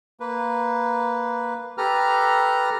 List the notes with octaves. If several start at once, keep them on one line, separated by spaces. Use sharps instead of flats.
A#3 B4
G4 A4 B4 A#5 F6